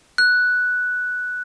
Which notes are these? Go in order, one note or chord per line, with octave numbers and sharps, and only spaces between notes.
F#6